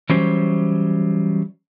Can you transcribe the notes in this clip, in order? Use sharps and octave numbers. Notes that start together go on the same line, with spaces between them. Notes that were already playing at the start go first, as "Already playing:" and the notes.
E3 F#3 G3 C#4 C5